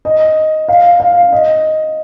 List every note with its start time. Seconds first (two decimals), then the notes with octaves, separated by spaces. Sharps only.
0.05 D#5
0.68 F5
1.00 F5
1.32 D#5